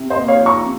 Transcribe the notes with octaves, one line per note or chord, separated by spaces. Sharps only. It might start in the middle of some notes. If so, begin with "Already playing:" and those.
Already playing: C3
C5 D#5
A#3
C#5 F5
F3
A#5 C#6
C3